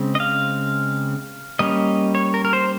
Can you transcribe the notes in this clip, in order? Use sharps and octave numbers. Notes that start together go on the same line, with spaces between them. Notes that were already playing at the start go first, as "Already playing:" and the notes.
Already playing: C#3 G#3 C4
D#5
F5
G3 A#3 C#4 D#5
C#5
A#4
A#4
C5